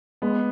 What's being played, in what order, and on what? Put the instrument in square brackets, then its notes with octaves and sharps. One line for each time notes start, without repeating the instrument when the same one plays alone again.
[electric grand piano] G#3 [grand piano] B3